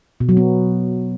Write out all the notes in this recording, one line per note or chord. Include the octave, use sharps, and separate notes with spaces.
B2
F#3
B3